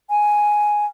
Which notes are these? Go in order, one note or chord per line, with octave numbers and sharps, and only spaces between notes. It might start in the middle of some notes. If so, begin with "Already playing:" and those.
G#5